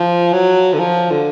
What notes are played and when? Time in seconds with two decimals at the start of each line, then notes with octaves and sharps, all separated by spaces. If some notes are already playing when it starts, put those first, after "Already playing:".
Already playing: F3
0.33 F#3
0.73 D3
0.79 F3
1.10 D3